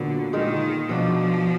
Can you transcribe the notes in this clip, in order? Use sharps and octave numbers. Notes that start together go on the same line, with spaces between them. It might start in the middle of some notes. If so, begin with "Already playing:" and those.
Already playing: A#2 D3 F#3 B3
A#2 D#3 G#3 D#4 A#4
B2 F3 F#3 D4